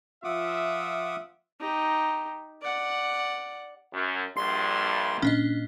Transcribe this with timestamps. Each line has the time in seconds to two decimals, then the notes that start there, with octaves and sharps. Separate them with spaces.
0.24 F3 F4 E5 F#5 D6 D#6
1.60 D#4 G4
2.62 D5 F#5
3.93 F#2
4.37 A#1 G2 C6 C7
5.22 A#2 C#4 D4 D#5